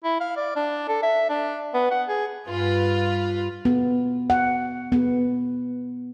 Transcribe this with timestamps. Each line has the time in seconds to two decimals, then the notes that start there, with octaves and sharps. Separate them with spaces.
0.04 E4
0.20 F5
0.37 D5
0.56 D4
0.88 A4
1.03 E5
1.29 D4
1.74 B3
1.91 F#5
2.08 G#4
2.48 G2 F4 B4
3.65 B3
4.30 F#5
4.92 B3